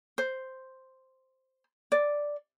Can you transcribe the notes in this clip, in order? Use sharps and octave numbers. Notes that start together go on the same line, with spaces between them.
C5
D5